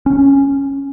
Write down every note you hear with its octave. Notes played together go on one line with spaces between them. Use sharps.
C#4